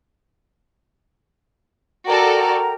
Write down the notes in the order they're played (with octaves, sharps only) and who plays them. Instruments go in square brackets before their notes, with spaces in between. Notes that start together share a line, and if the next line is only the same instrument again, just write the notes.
[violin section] F#4 A4 D5 [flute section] A#4 G5 A#5